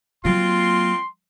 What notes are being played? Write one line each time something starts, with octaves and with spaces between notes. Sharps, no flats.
F#3 A#3 C4 F4 C6